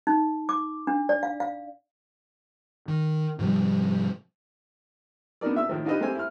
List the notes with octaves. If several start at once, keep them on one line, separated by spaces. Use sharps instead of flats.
D#4
D6
D4
D5
F5
F5
D#3
G#2 C3 F3 G3
B3 D4 D#4 A#4 D5
A#2 E5 E6
A2 D#3 F3
D4 D#4 F4 G4 B4 D#5
A3 A#3 C4 G4 C5 G#5
E4 F6